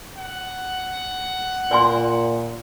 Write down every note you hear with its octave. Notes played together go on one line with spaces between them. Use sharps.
F#5
A#2 D5 G#5 C6